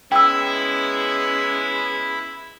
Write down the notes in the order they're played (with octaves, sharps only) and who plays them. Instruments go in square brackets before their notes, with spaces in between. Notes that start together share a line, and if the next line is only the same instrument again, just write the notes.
[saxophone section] G#3 B3 C#4 [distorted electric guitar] E4 [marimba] G5 E6